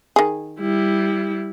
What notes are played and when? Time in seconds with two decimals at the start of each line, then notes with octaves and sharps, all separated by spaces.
0.16 D#3 G#4
0.60 G3 E4